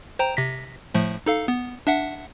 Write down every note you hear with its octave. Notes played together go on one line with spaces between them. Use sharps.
C5 G5 A#5
C3 A#6 B6
A2 F3 A3
D#4 A4 F5
B3
D4 E5 F#5